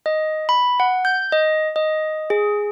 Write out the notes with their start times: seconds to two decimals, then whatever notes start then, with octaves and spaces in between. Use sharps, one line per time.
0.06 D#5
0.49 B5
0.80 F#5
1.05 G6
1.32 D#5
1.76 D#5
2.30 G#4